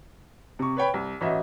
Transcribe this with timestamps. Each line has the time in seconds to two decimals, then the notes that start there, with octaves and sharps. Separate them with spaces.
0.59 C3 C#6
0.77 B4 C#5 G5 B5
0.94 C2
1.21 A1 F#4 D#5 E5